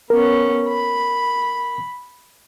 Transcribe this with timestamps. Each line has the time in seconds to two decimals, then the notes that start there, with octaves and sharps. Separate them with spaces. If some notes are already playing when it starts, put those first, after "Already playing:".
0.10 B3 C#4 A#4
0.69 B5